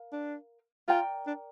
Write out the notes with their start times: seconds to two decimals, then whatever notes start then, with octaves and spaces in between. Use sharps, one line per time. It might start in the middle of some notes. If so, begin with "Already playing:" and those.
Already playing: A#4 F5
0.12 D4
0.88 F4 A#4 D5 G5 A#5
1.27 D4